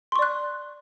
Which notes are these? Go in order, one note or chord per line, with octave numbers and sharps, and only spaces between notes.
D5 C6 C#6 F#6